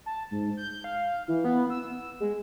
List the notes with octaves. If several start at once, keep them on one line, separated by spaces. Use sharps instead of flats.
A5
G#2
G6
F5
E3
B3
E6
G#3